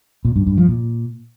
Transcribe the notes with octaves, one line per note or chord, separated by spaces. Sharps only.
A#2
G2
G2
F3
A#2